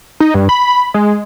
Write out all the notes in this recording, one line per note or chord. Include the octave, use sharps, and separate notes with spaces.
D#4
G2
B5
G#3